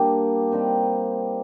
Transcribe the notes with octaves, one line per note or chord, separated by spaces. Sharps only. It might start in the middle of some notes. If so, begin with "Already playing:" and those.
Already playing: G3 A#3 D4 G4
G3 C4 D#4